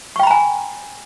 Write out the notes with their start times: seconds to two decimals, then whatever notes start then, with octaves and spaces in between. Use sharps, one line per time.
0.16 C#6
0.20 G5
0.23 B5
0.27 A#5
0.31 G#5